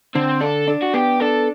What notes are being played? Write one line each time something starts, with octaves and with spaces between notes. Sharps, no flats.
D3 C4
D4 A4
D4
F#4
B3 G4
D4 A4